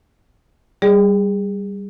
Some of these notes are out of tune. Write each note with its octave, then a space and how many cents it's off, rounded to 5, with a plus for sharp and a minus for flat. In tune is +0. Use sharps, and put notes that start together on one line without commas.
G3 +0 G#4 -25 D5 -15